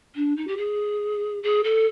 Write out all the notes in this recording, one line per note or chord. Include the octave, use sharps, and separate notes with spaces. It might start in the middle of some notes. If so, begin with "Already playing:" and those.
D4
D#4
G4
G#4
G#4
A4